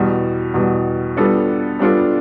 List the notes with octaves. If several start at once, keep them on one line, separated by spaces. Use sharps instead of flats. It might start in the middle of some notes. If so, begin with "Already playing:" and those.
Already playing: E2 B2 G3
E2 B2 G3
G3 B3 D4 F4 A4
G3 B3 D4 F4 A4